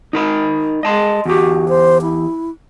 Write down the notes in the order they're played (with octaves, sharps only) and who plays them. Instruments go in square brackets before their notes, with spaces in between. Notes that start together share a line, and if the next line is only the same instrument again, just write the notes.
[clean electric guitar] D#4 A#4 B5
[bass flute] G#3 [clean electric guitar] D#5 A5 C6
[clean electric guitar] E2 G4 [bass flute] F#4
[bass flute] C5
E4